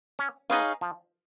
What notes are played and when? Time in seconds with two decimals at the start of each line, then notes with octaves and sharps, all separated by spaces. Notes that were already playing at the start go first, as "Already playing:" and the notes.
0.19 C#4
0.50 B3 D#4 G#4 C#5 F5
0.81 F3